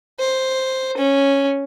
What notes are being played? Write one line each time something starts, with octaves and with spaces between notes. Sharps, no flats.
C5
C#4